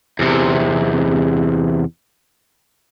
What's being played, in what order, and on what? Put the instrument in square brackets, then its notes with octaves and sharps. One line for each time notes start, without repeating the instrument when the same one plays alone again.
[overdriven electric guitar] E2 C3